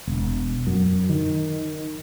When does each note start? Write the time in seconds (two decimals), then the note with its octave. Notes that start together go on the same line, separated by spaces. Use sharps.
0.07 E1
0.67 F#2
1.09 D#3